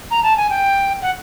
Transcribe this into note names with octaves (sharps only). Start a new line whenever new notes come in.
A#5
A5
G#5
G5
F#5